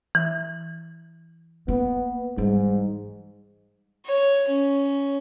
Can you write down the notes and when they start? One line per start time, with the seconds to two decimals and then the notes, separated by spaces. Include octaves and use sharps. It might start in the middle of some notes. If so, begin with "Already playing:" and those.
0.15 E3
1.68 A#3 B3
2.38 G#2 E3 G3
4.06 C#5
4.48 C#4